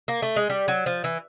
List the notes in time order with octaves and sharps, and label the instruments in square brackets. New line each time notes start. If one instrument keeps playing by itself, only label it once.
[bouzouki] A#3
A3
G#3
G3
F#3
F3
E3